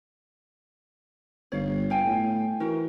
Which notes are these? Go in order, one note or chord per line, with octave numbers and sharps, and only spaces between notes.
G1 C#5 F5
F5 G5 G#5
A2
E3 F#4 A#4